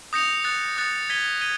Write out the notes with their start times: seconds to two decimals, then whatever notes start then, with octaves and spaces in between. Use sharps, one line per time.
0.13 D#6 G6 A#6 C#7 F7
0.44 D#6 F#6 A6 C#7
0.77 D#6 F#6 A6 C#7
1.09 G#6 B6 D#7 G7
1.41 G#6 B6 D#7 G7